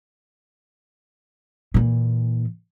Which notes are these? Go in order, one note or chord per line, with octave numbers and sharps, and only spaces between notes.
A#2 E3